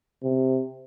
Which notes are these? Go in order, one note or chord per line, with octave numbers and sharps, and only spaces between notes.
C3